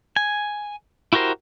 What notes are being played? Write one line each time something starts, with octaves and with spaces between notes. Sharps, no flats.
G#5
E4 F#4 G4 A#4 C5